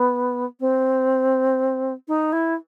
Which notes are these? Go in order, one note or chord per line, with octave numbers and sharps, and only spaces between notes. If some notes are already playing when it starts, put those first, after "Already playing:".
Already playing: B3
C4
D#4
E4